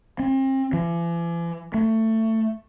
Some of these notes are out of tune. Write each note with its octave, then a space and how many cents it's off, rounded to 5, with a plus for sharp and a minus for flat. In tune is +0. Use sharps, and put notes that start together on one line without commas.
C4 +35
E3 +45
A3 +20